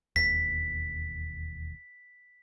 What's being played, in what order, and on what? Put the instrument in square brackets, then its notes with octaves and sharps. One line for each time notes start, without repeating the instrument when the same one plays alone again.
[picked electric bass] E1 D#2 [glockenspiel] B6